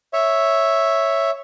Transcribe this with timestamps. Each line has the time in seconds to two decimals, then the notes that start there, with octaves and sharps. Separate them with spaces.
0.13 C#5 E5